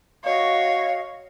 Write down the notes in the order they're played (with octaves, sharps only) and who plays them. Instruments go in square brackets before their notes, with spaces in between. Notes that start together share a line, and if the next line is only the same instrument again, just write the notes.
[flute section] F#4 D#5 F5 [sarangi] C#5